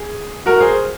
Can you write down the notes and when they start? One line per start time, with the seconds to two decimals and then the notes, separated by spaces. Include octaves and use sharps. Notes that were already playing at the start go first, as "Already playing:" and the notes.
Already playing: G#4
0.46 F#4 A#4
0.60 G#4 C5